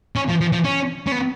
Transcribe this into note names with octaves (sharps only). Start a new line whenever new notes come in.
C#4
F3
F3
F3
C#4
C#4
B3